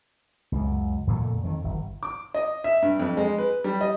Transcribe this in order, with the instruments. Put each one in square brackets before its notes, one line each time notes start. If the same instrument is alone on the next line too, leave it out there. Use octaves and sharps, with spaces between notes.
[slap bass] C#2 F#2
F2 A#2 D3 A3
F2 D#3
G1
[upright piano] D6
D#5
E5
G2
F2
G#3
B4
G3
D#5